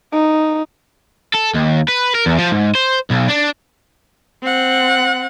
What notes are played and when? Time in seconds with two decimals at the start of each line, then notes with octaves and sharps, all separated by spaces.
0.13 D#4
1.34 A4
1.55 D#2
1.88 B4
2.15 A#4
2.26 E2
2.38 F3
2.52 G#2
2.75 C5
3.10 B1
3.29 D4
4.43 C4 F#5